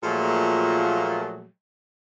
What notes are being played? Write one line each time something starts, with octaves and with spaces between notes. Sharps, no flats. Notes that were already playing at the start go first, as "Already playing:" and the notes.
A#2 F3 F#3 A3 A#3 G#4